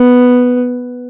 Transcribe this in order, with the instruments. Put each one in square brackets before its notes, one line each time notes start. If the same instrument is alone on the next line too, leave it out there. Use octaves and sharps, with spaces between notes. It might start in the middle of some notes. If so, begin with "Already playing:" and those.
Already playing: [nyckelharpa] B3